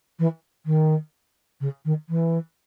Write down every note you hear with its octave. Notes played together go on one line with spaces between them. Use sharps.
E3
D#3
C#3
D#3
E3